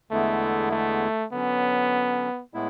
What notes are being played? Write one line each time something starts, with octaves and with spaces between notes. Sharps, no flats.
E2 D3 G#3 A3 B3 E4
A3
D3 F#3 B3 C#4
A2 G#3 B3 E4